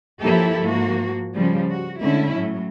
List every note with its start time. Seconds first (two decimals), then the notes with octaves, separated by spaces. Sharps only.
0.21 F3 F#3 A#3 E4 G4 A4
0.62 G#2 F3 A#3 F#4
1.33 C#3 F3 G3
1.70 F#4
2.02 D3 G#3 A3 C#4 E4
2.36 A2 F#3